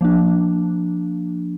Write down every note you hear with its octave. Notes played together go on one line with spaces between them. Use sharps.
F3 A#3 D4